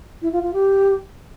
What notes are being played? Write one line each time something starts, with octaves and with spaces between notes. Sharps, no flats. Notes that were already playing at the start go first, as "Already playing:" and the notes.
E4
F4
F4
G4